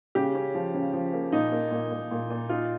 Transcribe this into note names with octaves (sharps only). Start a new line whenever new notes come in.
C#3 G4
C#4
F3
C#3
F3
A#3
A#2 D#4
A#3
A#2
A#2
A#2
A#2
D#4 F4